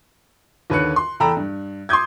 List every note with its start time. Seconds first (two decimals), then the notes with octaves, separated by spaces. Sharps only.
0.70 D#2 D3 B4 C#5 F#6 C#7
0.96 C6
1.20 E2 A4 G5 A#5 B5 E6
1.37 G2
1.89 C6 D6 D#6 G6 G#6